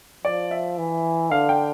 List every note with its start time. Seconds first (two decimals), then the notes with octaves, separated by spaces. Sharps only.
0.24 F3 D5
0.51 E5
0.78 E3
1.31 D3 F5
1.49 G5